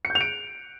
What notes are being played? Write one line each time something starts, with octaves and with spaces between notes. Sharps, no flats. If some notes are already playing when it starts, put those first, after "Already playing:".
C#7
G6
F7
D7